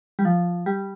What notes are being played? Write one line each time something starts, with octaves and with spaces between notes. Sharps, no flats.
G3
F3
G3